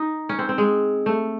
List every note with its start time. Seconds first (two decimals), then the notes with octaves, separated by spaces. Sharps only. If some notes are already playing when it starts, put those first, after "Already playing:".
Already playing: D#4
0.29 C#4
0.39 C4
0.49 C4
0.58 G#3
1.06 A3